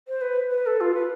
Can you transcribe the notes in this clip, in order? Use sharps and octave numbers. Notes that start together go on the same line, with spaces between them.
C5
B4
B4
A4
F4
B4